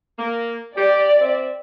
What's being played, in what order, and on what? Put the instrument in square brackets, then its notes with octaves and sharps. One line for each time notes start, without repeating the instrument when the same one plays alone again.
[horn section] A#3
[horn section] G4 [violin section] D5
[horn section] C4 E5